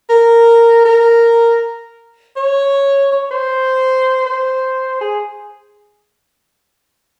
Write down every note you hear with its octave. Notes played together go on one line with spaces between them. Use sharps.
A#4
A#4
C#5
C#5
C5
C5
G#4